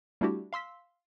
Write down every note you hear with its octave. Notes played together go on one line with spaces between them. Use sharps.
G3 A3 D4 E4 F#4 G4
F5 C6 E6 B6